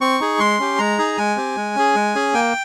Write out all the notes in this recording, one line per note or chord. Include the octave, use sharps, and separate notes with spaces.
C4 C#6
D#4 G#4
G#3 C6
C#4 G4
G#3 A#5
D#4 G#4
G#3 G#5
C4 G4
G#3
C#4 G#4
G#3
C#4 G#4
A#3 G5